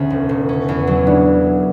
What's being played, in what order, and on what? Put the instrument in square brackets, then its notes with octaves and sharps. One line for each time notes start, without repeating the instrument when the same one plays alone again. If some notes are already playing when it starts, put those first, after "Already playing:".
Already playing: [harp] D2 C#3 [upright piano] C#4
[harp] E1
E1
C#4
E2
F#3
[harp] C#3 [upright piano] D4